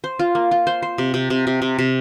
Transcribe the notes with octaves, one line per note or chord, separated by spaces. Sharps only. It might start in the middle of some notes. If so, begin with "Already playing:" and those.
C5
F4
A#3
F4
C5
C5
C3
C3
C3
C3
C3
C3